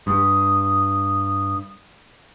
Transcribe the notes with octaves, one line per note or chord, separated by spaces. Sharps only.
G2 D#6